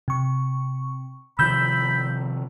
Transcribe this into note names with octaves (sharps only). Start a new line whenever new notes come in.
C3 C#6
C3 D#3 F3 B5 E6 G6